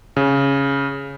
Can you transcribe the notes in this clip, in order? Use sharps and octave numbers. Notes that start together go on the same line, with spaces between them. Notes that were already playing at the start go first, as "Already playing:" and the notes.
C#3